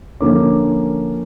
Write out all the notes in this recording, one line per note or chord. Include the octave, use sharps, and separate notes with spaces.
D3 F3 A#3 C#4 D6